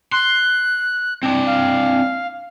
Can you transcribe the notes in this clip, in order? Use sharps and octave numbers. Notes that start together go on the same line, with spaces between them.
C6 F#6
C4 D4
F5